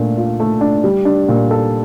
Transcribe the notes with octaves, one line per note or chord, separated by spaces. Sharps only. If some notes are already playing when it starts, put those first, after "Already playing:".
Already playing: A#2 A3 D4
F4
A3
D4
G3
D4
A#2
A4